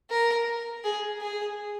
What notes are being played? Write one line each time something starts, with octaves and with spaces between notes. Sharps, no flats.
A#4
G#4
G#4